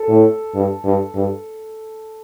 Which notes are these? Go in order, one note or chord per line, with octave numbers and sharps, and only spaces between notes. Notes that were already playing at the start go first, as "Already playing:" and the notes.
Already playing: A4
A2
G2
G2
G2